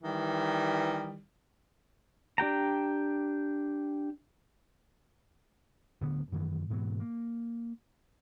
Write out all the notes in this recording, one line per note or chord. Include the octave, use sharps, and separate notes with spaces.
D#3 E3 G3
D4 G4 G5 A#5
D1 D2 D3 B3
F#2 D#3 E3
G#2 B2 E3 F#3
A#3